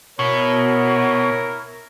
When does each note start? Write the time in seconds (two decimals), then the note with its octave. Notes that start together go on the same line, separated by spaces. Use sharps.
0.19 B2 E4 A#4 C#5